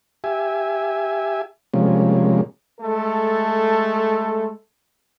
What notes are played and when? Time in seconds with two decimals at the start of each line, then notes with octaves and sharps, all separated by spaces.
0.24 G4 E5 G#5
1.74 C3 F3 G3 G#3 A#3 C#4
2.81 G#3 A3 A4